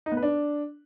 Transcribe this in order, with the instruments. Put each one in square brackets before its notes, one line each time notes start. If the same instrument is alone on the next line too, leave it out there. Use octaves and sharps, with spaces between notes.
[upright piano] D#4
B3
B4
D4